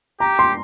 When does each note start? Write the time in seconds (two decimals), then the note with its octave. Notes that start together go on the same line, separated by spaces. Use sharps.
0.20 G4 A#5
0.39 C6